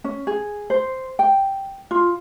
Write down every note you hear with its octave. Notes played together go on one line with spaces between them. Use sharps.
C#4
G#4
C5
G5
F4